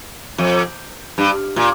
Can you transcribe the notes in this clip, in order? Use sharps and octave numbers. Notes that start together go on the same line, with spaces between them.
F2
G2
A#2